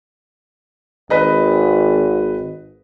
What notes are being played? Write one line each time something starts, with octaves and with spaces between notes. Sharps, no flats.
G#1 B4 D#5